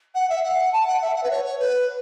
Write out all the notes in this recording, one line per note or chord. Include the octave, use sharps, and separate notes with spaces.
F#5
E5
F#5
A5
F#5
E5
F#5
B4
C#5
C#5
B4